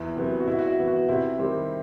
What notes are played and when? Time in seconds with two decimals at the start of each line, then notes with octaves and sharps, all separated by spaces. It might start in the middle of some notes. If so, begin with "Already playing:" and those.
Already playing: E2 E4
0.16 C3 F#3 B3
0.40 F#4
0.47 C3 E4
0.59 F#4
0.67 E4
0.78 E3 B3
0.88 F#4
1.09 C3 E4
1.39 D#3 G3 C4